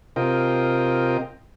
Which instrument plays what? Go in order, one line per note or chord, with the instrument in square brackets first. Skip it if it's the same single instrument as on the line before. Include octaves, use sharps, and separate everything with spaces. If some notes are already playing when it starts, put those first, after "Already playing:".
[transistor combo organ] C3 C4 F4 A#4 D#5 G5